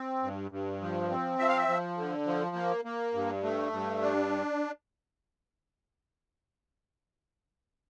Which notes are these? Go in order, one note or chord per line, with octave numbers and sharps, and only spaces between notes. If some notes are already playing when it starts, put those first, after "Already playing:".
Already playing: C4
G2
G2
F3
C4
F3 E5
F5
E5
F3
D3
F3
A#3
A#3
G2
A3
G2
D4